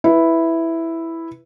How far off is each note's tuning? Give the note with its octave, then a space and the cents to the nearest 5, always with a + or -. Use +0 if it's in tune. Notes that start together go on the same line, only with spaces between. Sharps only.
E4 +0 B4 +0